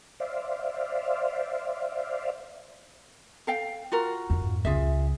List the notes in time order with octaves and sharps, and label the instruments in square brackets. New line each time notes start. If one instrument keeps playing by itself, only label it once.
[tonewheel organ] C5 D5 E5 F5
[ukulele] A4 F5 G5
F4 F#4 A#4
[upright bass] F2 G#2
[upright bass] C#2 [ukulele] F4 G#4 E5